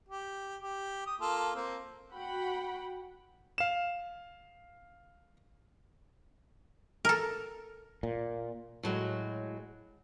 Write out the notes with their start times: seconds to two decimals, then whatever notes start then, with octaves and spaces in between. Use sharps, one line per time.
0.08 G4
0.61 G4
1.07 D#6
1.21 A#3 F4 A4
1.55 A#3 C4
2.14 F#4 F#5 G5 B5
3.58 F5 E7
7.05 A4 A#4
8.03 A#2
8.83 A2 F#3 G#3